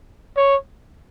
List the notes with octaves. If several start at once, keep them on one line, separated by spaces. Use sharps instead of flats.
C#5